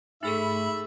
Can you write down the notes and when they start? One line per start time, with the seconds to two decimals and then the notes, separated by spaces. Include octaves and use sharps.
0.23 G#2 A3 D#4 G#4 A4 E5 B5